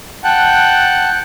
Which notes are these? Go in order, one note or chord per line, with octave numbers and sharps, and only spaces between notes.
F#5 G5 A5 F#6